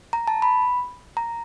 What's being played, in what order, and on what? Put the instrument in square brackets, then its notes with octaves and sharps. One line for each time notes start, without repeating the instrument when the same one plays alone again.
[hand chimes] A#5
A5
B5
A#5